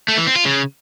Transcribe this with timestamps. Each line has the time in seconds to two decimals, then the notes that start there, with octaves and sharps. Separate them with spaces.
0.08 A3
0.17 E3
0.27 C4
0.36 F4
0.45 C#3